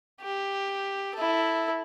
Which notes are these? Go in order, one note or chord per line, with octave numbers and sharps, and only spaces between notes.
G4
E4 A4